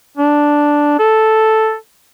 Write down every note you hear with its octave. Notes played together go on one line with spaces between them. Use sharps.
D4
A4